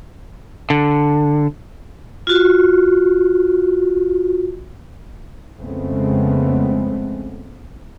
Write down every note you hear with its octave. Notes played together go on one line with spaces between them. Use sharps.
D3
F4 F#4
F2 C#3 G#3 A3 B3 C4